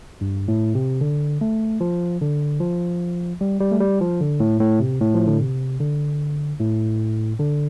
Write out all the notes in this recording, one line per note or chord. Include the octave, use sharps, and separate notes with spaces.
G2
A2
C3
D3
A3
F3
D3
F3
G3
G3
A3
G3
F3
D3
A2
A2
C3
A2
F3
D3
C3
D3
A2
D3